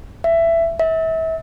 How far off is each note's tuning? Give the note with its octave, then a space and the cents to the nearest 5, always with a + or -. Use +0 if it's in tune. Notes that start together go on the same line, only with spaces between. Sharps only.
E5 +15
E5 -30